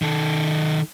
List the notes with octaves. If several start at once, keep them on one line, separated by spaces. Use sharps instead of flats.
D#3 A4